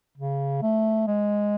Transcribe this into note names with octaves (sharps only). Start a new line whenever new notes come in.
C#3
A3
G#3